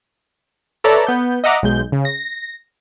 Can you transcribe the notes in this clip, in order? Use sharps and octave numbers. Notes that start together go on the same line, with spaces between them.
A4 B4 C#5 D5 E5 A#5
B3 G6
D#5 E5 F#5 A#5 D6
B1 G#3 G6
C#3
A#6